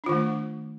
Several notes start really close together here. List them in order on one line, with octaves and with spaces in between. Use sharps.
D4 F4 D#3 A3